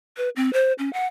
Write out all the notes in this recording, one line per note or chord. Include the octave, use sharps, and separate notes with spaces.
B4
C4
C5
C#4
F#5